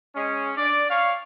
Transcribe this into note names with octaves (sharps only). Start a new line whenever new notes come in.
G#3 C#4
D4 D5
C#5 F5